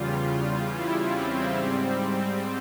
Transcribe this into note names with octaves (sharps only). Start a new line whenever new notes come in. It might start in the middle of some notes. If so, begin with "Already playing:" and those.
Already playing: E2 C#3 G3 F4
E4
C4
G#2 G3
C4